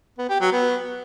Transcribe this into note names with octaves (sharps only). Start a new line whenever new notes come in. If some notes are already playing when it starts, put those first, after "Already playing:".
B3
G4
F#3
B3